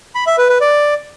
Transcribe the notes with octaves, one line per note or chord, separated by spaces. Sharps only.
B5
E5
B4
B4
D5